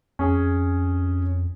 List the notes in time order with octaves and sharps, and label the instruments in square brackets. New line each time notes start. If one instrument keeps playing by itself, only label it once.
[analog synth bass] F2 [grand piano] C#4 G#4